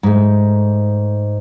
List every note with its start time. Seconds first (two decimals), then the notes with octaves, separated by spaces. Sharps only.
0.03 G#2 A3